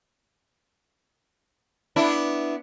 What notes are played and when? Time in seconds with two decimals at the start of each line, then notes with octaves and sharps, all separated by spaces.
1.96 B3 D4 E4